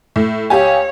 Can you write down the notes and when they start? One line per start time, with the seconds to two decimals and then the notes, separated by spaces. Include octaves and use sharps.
0.16 A2
0.50 C#2 G4 C#5 G#5